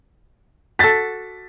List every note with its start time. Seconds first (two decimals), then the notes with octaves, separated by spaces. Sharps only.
0.79 F#4 A4 A6 B6